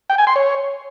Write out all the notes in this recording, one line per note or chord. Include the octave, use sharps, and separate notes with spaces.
G5
G#5
C6
C#5